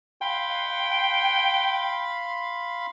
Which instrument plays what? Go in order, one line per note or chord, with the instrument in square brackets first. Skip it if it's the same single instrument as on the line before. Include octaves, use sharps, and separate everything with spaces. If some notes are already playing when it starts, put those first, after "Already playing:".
[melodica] F5 B5 C6 [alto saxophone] G5